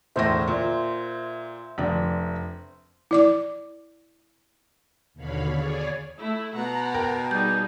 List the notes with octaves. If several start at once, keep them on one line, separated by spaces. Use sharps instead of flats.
E1 A2 C5 E5 C6 A#6
A#2
F1 D4
E4 D5 D6
D#2 B2 D3 C#5 F5 B5
G#4 C#5 D5 G#5
A3 E4
B2 F#5 A#5
A#4 G5
G3 D#4 G#4 G6